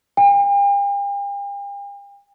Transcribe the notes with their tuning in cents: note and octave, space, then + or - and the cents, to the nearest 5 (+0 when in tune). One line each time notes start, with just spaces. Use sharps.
G5 +45